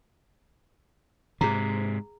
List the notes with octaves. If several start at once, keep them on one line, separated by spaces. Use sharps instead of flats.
G#2 C3 G#4 A#5